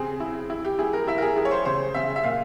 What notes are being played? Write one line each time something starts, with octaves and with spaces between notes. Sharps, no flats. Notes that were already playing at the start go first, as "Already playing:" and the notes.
Already playing: C#3 C4 G#4
E4
E4
G4
E4 G#4
A#4
E4 E5
A#4
G#4
E4 G#4
C#5
C5
C#3 C5
C#3 E5
E5
A#2 F5